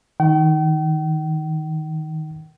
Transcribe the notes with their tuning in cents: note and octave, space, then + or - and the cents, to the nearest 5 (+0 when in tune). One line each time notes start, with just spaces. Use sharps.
D#3 +15 G5 -40